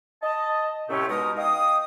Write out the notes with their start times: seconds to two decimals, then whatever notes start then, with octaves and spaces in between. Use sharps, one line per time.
0.22 D#5 A5
0.89 C2 A2 C3 A3 C4 C#4
1.09 B2 G#3 D#4 A#4 D#6
1.37 D#5 F5 G5 D#6